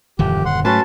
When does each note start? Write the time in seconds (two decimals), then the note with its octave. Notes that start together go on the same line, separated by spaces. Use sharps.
0.19 D#1 F#2 D3 E3 F3 G4
0.45 F#2 F#5 C6
0.65 G#2 F#3 A3 C#4 F#4 B4 A5 C6